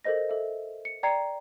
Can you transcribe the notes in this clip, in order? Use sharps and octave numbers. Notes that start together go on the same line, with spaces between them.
A4 A#4 C5 D#5 A#6
A4 E5
C#7
D5 G5 A#5 G#6 C7 C#7